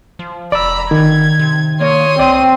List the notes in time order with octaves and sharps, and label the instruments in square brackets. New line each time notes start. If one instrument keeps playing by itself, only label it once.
[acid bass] F3
[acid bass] F1 [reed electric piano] D5 E6 [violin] A#5 B5
[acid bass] G1 [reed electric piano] D#3 [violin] G#6
[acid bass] C3
[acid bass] A#3 [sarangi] C#5 [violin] C6 D#6
[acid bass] C2 [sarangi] C4 [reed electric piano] D5